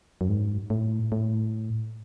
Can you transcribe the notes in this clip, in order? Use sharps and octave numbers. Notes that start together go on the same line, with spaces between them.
F#2
G#2
A2
A2